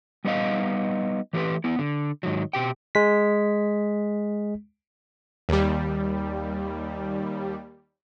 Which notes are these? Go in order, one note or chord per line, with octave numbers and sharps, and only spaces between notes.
G3 B3 D#4 D#5 F5
E3 F#3 A3 G4 B4
B3 E4
D3
G#2 D#3 F#3
B2 G4 G5
G#3 B6
D#2 G3